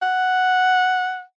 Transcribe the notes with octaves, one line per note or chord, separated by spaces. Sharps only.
F#5